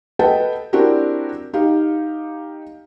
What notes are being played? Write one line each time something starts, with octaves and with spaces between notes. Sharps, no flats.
A4 B4 D#5 F#5 G5 A5
C4 D4 E4 F#4 G4 A#4
D#4 G4 F5